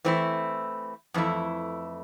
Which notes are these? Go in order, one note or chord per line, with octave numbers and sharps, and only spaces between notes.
E3 A3 C4 E4
F2 E3 A3 E4